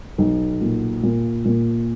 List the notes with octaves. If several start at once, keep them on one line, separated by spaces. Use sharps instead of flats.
B1
A#2
A#2
A#2